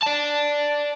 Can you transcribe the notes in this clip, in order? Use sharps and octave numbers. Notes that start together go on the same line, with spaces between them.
D5 A5